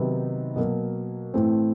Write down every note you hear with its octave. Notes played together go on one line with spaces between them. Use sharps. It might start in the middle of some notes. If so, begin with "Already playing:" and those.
Already playing: C3 D#3 F#3 B3 D#4
B2 F#3 A#3
A2 E3 A3 C4